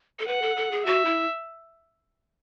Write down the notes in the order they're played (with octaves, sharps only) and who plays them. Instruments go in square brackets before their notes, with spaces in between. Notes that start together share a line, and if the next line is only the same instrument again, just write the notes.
[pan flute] A4
[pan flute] B4 [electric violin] F#5
[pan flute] A4
A4
G#4
[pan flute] F#4 [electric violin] E5
[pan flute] E4